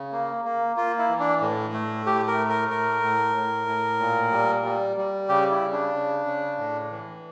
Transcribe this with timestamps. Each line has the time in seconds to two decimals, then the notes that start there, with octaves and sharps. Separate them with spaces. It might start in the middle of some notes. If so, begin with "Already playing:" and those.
Already playing: C#3
0.12 A#3
0.45 A#3
0.76 A#3 F4
0.99 E4
1.09 E3
1.20 D4
1.41 A2
1.74 A3
2.06 A2 G4
2.28 A#4
2.38 A3
2.49 A#4
2.70 A2 A#4
3.03 A2
3.35 A2
3.67 A2
3.99 A#2
4.32 G3
4.64 G3
4.97 G3
5.29 C#3 G4
5.51 E4
5.61 C#3
5.72 D4
5.94 C#3
6.26 C#3
6.58 A2
6.91 E3